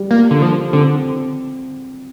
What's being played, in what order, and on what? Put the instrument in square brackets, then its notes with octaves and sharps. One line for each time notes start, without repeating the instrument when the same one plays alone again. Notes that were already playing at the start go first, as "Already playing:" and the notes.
Already playing: [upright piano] G3
[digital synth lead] A#3 [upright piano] F4
[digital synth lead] D3
[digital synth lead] F3 [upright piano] G3
[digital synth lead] D3 [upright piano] C4